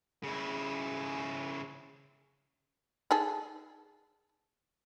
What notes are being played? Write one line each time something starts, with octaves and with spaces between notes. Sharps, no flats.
C#3 E4
D#4 G#4 A4